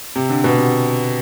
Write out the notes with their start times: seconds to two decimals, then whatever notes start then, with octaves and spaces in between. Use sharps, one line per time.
0.16 C3
0.29 D3
0.44 B2
0.57 C3